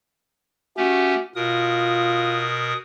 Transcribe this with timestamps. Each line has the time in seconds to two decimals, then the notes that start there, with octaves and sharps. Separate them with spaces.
0.77 A3 C#4 F#4 G4
1.35 B2 F4 A#4 D#6